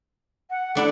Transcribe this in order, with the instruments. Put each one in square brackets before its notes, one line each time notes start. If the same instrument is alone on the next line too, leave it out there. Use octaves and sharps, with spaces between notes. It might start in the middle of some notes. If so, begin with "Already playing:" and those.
[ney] F#5
[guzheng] A3 D4 E4 [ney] F#5